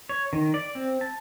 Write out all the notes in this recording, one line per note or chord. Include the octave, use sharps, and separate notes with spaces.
C#5
D#3
D5
C4
A5